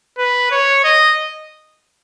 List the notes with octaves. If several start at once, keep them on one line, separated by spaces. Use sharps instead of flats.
B4
C#5
D#5